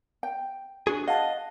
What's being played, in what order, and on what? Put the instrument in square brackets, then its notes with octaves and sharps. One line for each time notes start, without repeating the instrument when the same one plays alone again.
[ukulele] G5
[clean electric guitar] D4 F#4 G#4
[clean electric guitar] D#5 [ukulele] F5 [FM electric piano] F#5 A5